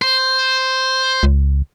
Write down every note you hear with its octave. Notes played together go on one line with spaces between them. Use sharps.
C5
C#2